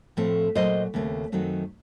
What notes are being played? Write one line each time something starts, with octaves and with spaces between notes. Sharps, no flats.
A2 F3 A3 C4
A#2 F#3 A3 C5 D#5
D#2 C#3 A3 C4
F#2 D#3 F#3 A3 C4